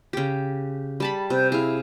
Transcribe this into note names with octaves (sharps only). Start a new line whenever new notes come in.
C#3 G4
G3 A5 B5
C3 C5
E4 G#4 F5